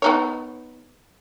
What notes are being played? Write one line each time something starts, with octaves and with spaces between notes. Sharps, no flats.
B3 D#4 C#5